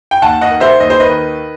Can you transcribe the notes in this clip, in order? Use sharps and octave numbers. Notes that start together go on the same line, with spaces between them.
G5
D#2 F#5 A5
D#5 F#5
D#3
C5 E5
D#2 D#5
C5
B4 D#5
D#3